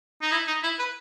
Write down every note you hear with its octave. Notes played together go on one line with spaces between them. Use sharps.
D#4
E4
D#4
E4
B4